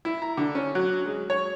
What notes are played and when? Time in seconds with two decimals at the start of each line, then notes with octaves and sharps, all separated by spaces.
0.05 E4
0.22 A#5
0.37 D3
0.55 C#4
0.75 F#3
1.06 G#3
1.30 C#5